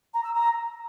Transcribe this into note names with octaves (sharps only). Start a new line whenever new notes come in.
A#5
E6
A#5